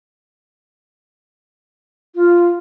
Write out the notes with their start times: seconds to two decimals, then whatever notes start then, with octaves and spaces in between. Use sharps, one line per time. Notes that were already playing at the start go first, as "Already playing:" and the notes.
2.15 F4